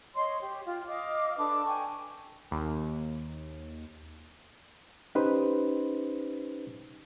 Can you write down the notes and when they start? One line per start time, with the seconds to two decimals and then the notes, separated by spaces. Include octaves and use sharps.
0.16 C#5 D#5 C6
0.41 G4
0.66 F4 G5
0.87 D#5 F5 D6
1.37 D4 A4 B4 D6
1.65 G5 G#5 C#6
2.51 D#2
5.15 C#4 D#4 G4 B4 C5